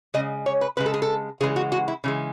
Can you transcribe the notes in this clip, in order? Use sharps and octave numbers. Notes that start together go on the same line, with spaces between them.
C#3 G#3 D#5
C#5
B4
C#3 G#3 B4
A4
G#4
A4
C#3 E3 G#3 G#4
F#4
F#4
E4
C#3 E3 G#3